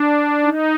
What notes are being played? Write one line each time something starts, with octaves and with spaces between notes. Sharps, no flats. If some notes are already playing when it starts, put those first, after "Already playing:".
Already playing: D4
D#4